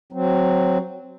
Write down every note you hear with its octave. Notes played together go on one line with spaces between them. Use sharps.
F#3 C4